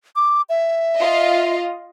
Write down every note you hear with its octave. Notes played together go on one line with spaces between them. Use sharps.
D6
E5
F4 D#5